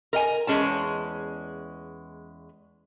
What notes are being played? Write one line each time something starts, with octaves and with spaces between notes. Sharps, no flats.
A#4 D#5 G#5
E2 G#2 G#3 C#4 A5